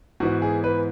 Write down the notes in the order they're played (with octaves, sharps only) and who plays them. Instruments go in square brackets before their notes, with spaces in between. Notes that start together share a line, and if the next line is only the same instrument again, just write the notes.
[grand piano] G#2 E3 B3 F#4
G#4
B4